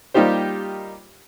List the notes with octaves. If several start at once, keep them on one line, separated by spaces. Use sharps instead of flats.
G3 A#3 D#4 F4 G4 C5